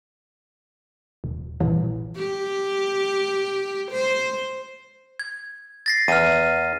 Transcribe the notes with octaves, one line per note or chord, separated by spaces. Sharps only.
D#1
A#1 G2 E3
G4
C5
G#6
A6 A#6 C7
E2 F6 D#7